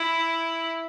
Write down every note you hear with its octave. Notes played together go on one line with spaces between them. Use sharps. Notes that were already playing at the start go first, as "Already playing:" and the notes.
Already playing: E4